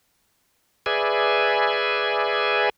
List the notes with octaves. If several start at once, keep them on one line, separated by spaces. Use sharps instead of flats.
G#4 B4 D5 E5 G#5